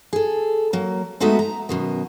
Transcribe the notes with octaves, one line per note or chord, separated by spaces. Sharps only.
G#4 A4
F#3 A#3
G#3 A3 B3 D#4 F#4 E5
A#5
F#2 B2 D#3